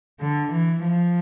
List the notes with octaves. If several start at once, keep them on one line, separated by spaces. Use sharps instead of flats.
D3
E3
F3